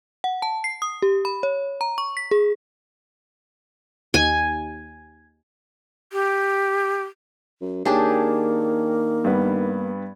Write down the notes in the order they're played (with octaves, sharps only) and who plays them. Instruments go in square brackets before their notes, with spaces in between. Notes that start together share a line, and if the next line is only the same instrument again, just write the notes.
[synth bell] F#5
A5
C7
D#6
G4
B5
C#5
A#5
C#6
B6
G#4
[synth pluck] D#2 [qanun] G#5
[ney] G4
[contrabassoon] F#2
[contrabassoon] D#3 [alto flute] A#3 [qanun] D4 G4 G#4 [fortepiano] C#5 G5 A5
[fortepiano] G2 B3